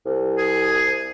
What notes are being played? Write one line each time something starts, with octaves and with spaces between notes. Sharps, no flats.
C2
G#4